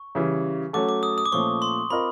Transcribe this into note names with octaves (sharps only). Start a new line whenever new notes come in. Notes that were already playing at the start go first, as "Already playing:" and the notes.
Already playing: C#6
C#3 E3 G3
F#3 A3 C#4 F#4 A4 D6
D6
D#6
D#6
D6
A#2 F3 A3 C#4 C#6
C6
C4 F4 A#4 D#5 B5